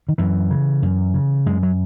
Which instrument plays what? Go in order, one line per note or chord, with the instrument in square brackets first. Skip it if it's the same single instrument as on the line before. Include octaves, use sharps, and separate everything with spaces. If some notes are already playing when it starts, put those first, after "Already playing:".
[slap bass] D#3
F#2 E3
C#3
F#2
C#3
F#2 G#3
F#3